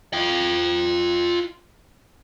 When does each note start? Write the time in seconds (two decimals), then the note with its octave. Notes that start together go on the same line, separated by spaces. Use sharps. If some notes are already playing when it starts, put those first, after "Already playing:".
0.13 F4 G5